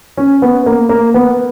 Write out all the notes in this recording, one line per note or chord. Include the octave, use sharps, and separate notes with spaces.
C#4
B3
A#3
A#3
B3